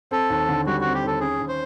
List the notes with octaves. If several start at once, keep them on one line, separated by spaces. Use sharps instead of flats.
C4 A4
D#2
D3
G3 F#4
C4 F#4
G4
D#2 A4
C#4 G#4
D#2
C5